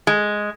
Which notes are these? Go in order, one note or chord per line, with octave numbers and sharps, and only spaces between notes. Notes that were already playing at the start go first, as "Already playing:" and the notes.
G#3